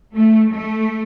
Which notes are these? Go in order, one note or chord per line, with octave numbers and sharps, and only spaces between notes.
A3
A3